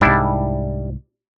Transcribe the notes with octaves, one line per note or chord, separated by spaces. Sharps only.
C2 G#2 G3 D4 E4